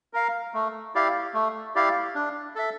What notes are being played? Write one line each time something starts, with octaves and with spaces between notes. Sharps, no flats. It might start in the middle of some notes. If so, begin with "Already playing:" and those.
A#4 F5
A3
E4 G4 D5 F5
A3
E4 G4 D5 F5
D4
A4 E5